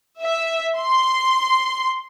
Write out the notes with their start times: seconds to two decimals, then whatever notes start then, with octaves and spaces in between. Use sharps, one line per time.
0.21 E5
0.79 C6